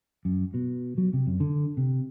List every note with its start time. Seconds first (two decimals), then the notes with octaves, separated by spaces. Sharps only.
0.25 F#2
0.54 B2
0.98 F#3
1.13 C3
1.27 F#2
1.40 D3
1.77 C3